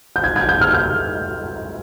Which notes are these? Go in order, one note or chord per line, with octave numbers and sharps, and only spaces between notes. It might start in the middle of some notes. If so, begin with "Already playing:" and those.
G6
G#6
G#6
G6
F6
G6